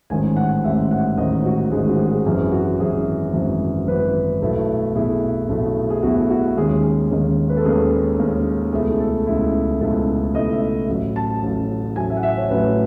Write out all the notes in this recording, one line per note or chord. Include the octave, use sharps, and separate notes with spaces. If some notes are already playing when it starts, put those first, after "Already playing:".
A1 G#2 D#3 G#5
F#5
A1 G#2 D#3 E5
F#5
A1 G#2 D#3 D#5
F#4
A1 G#2 D#3 G#4
F#4
G#4
G#1 F#2 E3 G#4
F#4
G#1 F#2 E3 G#4
G#1 F#2 E3
G#1 F#2 E3 B4
B1 B2 A3 E4
B1 B2 A3 E4 G#4
B1 B2 A3 E4
G#4
B1 B2 A3 E4 F#4
F#4
D#2 D#3 G#3 C#4 G#4
G#4
D#2 D#3 G#3 C#4
B4
A4
D#2 D#3 G#3 C#4 G#4
D#2 D#3 G#3 C#4
C#2 B2 A3 E4 G#4
A4
C#2 B2 A3 E4
C#2 B2 A3 E4 A4
C#2 B2 A3 E4 D#5
E5
A1 A2 F#3
A5
A1 A2 F#3
A1 A2 F#3 G#5
E5
F#5
E5
C#5
A1 A2 F#3 B4